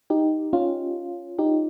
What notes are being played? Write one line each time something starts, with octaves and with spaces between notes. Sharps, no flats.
D#4 G4
C#4 F4
D#4 G4